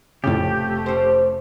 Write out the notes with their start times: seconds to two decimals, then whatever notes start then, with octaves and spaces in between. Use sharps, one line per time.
0.24 F1 F2 A2 C#3 A3 G4
0.86 C#4 C5